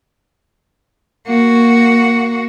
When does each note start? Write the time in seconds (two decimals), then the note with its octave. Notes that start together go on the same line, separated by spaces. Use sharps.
1.27 A#3 F#4